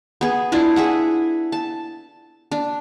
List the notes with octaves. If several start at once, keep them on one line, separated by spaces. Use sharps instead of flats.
B3 G#4
D4 E4 F4
G#4 E5 F#5
A5
D4